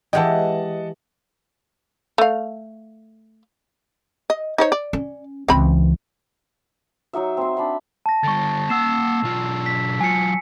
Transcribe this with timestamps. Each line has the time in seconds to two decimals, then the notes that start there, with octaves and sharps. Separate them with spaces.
0.13 E3 G#3 G4 D#5 F#5 A5
2.18 A3 F5
4.30 D#5
4.58 D#4 C5 C#5
4.72 D5
4.93 C#4
5.48 C#2 E3 C4 B5
7.13 F#3 D#4 F#4 E5
7.37 C4 C6
7.57 D4 B5 C6
8.06 A5 A#6
8.23 G2 D3 C#6 A6
8.69 A#3 F#5 E6 C7 E7
9.23 B1 F4
9.66 B6
10.01 F#3 F4 G#5 C7 C#7